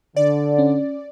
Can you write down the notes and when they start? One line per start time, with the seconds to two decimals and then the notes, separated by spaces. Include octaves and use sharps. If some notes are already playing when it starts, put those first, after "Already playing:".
0.16 D3 D5
0.58 C#4